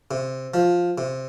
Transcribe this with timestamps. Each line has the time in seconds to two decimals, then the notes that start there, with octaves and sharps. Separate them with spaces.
0.11 C3
0.54 F3
0.98 C3